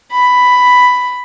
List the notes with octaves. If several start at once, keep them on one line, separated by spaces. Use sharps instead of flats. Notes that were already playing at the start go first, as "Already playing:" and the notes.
B5